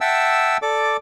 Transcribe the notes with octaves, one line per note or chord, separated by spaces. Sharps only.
E5 F#5 G5 A5 E6
A4 D5 D6